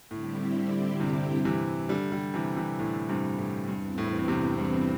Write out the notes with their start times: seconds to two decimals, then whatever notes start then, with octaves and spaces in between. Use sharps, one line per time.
0.11 A2 D3 G3 C4 E4 G4
1.00 G2 C3
1.45 C3 E3
1.89 D3 G3
2.12 D3 G3
2.34 C3 E3
2.57 C3 E3
2.79 A2 D3
3.09 G2 C3
3.38 A2
3.68 E2 G2 E3 C4
3.98 A2
4.18 A2
4.28 G2 C3
4.58 G2